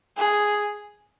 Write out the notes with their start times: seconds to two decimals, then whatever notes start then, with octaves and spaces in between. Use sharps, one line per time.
0.17 G#4